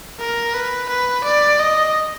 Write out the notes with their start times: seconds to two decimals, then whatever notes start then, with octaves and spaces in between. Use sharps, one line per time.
0.20 A#4
0.54 B4
0.89 B4
1.24 D5
1.59 D#5